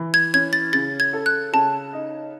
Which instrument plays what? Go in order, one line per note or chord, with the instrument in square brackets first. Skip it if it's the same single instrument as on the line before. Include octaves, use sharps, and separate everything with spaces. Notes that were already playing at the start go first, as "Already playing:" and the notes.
Already playing: [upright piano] E3
[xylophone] G#6
[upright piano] C#4 [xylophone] G#6
[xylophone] A6
[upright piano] C#3 [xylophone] A6
[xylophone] G#6
[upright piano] A4
[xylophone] F#6
[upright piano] C#3 [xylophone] A5
[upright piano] D#4